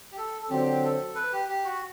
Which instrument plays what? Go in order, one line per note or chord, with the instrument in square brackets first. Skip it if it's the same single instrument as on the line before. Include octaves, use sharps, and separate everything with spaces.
[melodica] G4
A4
A4
[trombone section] D3 F#3 C4 [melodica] G4
[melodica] A4
B4
G4
G4
F#4